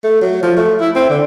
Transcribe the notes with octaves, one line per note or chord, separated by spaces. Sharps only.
A3
F#3
F3
A3
E4
C4
D3